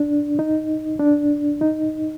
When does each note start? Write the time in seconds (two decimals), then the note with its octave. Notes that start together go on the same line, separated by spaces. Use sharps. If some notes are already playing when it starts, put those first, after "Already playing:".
Already playing: D4
0.39 D#4
0.99 D4
1.61 D#4